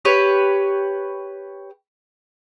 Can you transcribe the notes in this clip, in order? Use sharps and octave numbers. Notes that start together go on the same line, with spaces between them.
G4 B4 C#5